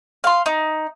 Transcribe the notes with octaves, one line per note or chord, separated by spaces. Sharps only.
F5 C6
D#4